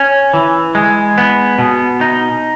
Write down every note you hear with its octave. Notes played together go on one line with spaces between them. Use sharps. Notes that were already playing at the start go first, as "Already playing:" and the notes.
Already playing: C#4
E3
G#3
B3
B2
D#4